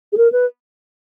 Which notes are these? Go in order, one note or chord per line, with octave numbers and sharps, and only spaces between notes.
G#4
A#4
B4